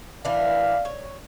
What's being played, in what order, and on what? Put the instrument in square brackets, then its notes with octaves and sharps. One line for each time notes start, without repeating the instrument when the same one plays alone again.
[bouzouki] E3 D4 [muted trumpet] F5
[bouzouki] C#5